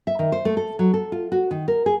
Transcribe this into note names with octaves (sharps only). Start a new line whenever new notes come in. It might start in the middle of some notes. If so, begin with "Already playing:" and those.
E5
D#3
C5
A3
A4
F#3
A4
F4
F#4
D#3
A#4
G#4